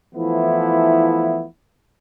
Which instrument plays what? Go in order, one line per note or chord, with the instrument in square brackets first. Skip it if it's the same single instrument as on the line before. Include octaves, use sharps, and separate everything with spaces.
[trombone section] E3 F3 A3 B3 E4